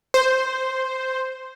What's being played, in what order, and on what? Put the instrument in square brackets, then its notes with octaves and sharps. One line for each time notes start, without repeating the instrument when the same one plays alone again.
[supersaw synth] C5